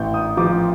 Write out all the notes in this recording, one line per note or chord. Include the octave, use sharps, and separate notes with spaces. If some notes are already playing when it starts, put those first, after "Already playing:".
Already playing: A1 G6
D#6
F3 D6